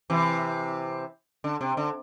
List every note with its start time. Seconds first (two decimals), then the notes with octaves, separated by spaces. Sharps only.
0.10 C3 E3
1.44 D3
1.61 C3
1.77 D3